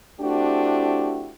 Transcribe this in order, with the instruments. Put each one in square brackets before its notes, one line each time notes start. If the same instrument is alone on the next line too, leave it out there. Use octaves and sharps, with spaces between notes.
[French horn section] A3 C4 D4 E4 F#4 G4